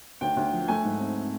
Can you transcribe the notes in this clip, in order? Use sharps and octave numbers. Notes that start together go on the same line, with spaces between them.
D2 G5
D2
F3
A3 G#5
G#2
C4